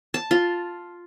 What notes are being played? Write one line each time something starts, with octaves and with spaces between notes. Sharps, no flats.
A5
F4